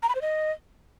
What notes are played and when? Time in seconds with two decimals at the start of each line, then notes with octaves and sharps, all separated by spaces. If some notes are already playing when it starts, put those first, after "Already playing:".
0.03 A#5
0.09 B5
0.15 C5
0.21 D#5